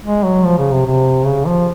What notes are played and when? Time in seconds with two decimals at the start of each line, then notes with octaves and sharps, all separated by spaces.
0.05 G#3
0.25 F#3
0.45 F3
0.59 C#3
0.72 C3
0.85 C3
1.25 C#3
1.47 F3